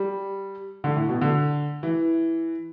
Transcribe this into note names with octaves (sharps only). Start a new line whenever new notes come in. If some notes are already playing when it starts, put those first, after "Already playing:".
Already playing: G3
D3
A2
B2
D3
E3